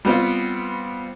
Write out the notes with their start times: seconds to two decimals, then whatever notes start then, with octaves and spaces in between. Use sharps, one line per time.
0.05 G3 B3 C4 F4